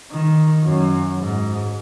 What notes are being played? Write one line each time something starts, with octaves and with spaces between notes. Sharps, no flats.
D#3
F#2
G#2